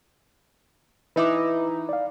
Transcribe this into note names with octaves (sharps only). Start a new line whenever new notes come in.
E3 D#4 E4 B4 E5 D6
D5 F5